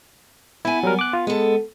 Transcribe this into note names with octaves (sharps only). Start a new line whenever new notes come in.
B3 E4 G#5
F#3 G3 A#4
D6 F#6
F4
G#3 B3 A4